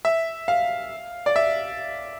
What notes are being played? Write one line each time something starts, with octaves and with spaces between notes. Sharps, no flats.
E5
F5
D5
E5